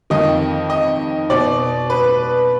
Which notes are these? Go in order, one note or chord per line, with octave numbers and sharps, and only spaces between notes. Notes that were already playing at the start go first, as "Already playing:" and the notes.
F2 D#3 D#5
D#5
B2 D5
B4